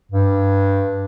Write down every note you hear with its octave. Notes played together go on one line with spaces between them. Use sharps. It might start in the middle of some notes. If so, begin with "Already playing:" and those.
G2